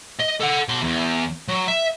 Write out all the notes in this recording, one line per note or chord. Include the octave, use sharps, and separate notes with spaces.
D#5
A4 F#5
B2 C6
E2
F#3
E5